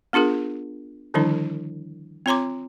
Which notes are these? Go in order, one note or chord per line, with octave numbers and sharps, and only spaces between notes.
B3 D4 F4 G#4 A#4
D3 D#3 F3 G3 D4 E4
C4 F4 C#5 A#5 C6 D6